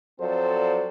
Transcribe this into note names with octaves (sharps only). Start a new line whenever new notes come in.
F3 F#3 C4 A4 C5 D5